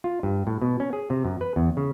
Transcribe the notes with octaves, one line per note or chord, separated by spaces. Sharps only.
F4
G2
A2
B2
C#4
G#4
C3
F#2
B4
E2
C#3